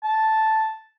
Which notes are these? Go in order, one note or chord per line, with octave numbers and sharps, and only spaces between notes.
A5